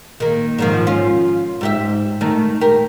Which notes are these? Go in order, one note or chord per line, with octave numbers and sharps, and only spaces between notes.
D#3 A#3
G#2 D#3 F3
C#4 F4
G#2 G4 E5
D#3 A3
G4 A#4